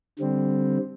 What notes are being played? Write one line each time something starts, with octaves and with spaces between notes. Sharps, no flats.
D3 G3 C4